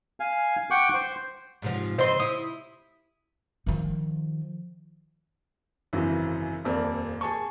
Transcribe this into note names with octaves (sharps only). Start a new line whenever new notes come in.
F5 G#5
F#5 G5 C#6 D6
C5
G#2 C3 F3
C#3 C4 C5 D#5 C6
E4 D#6
D#3 F3
G#1 F#2 C#3 E3
D#1 F2 A#3 D5
G#4 A5 C#6